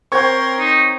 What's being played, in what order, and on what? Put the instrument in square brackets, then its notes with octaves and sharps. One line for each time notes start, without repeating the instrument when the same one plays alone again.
[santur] C4 C#5 G5 [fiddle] A#4 C6 [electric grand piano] C#6 G#6
[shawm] D#4